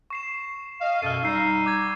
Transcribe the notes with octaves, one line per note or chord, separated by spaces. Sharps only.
C#6 C7 E7
D#5 F5
F#2 B2 A4 F6 D#7
G3 D#4 E6 C7 D#7
D6 G6 G#6